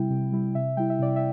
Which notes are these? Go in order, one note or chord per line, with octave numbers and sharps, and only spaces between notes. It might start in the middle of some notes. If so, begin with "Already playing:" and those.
Already playing: C3 G3 E4 G5
C3
G3 E4
C3 E5
G3 E4 G5
E5
C3 D5
E5